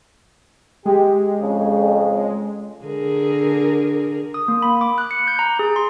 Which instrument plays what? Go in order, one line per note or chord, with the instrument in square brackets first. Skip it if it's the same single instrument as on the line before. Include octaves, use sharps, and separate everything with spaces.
[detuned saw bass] G#3 [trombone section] G4
[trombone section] F2 C#3
[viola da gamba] D3 G#4 A#4
[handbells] D#6
A#3
B5
D6
F#6
C#7
G6
A#5
G#4
C6